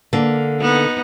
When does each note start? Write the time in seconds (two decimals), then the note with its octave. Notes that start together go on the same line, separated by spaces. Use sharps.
0.13 D3 A#3
0.61 B3 D#4